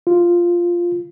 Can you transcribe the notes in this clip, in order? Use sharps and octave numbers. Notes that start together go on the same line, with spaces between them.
F4